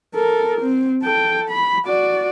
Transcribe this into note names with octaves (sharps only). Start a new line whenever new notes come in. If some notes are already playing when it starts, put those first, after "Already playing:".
A4 A#4
C4
A4 G5
B5
F#4 D5